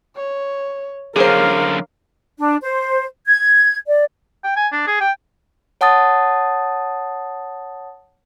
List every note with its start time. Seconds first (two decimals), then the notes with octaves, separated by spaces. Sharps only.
0.16 C#5
1.16 F#2 D3 G#4 A#4 C5 C#5 F5
2.38 D4
2.63 C5
3.27 G#6
3.87 D5
4.44 G5
4.57 G#5
4.72 D4
4.87 G#4
5.01 G5
5.81 C#5 F#5 A5 D#6 A6